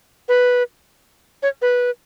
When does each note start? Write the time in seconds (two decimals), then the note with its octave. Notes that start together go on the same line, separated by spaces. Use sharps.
0.29 B4
1.43 C#5
1.62 B4